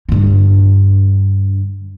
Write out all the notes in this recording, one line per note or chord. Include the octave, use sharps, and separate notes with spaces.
G2 D3